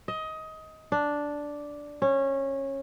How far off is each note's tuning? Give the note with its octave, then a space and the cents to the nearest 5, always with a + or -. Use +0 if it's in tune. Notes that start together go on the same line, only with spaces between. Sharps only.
D#5 +20
D4 -5
C#4 -20